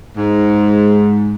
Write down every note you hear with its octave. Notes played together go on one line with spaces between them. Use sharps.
G#2